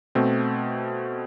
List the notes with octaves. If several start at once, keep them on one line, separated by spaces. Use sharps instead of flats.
B2 A3 C4